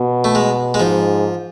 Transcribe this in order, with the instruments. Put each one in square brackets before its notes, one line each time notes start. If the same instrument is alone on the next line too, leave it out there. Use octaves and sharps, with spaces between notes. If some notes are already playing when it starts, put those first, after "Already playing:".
Already playing: [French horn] B2
[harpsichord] A3
G#3
G#3
[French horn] G#2 [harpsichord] F3